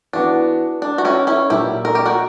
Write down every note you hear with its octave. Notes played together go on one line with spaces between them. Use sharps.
E3 B3 D4 F#4
D4
F#4
C#4 E4
C#4 E4
A#2 F#3 A#3 D4 E4 G4
A#4
G4
F#4 A#4